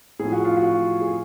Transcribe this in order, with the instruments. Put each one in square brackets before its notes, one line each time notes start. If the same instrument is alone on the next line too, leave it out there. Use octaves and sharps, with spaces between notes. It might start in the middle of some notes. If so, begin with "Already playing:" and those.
[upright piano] A2 F3 G#4
F#4
F4
F#4
G#4